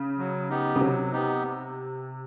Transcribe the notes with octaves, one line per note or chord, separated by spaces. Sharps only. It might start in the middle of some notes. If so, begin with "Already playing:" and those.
Already playing: C#3
F#3
B3 D#4 G4
C#3
C3 F#3
B3 D#4 G4